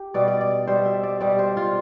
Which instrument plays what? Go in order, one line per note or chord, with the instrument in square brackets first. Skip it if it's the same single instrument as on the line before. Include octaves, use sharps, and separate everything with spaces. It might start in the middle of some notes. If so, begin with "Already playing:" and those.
Already playing: [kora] G4
B2 G3 D5
D5
D5
B2 G3 C5
E5
D5
B2 G3 D5
C5
F4